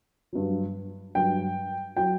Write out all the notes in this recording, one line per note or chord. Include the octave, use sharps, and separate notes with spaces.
G2 F#3
G2 F#3 G5
F#3 G5